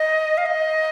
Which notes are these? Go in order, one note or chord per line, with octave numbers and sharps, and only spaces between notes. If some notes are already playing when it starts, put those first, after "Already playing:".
Already playing: D#5
F5
D#5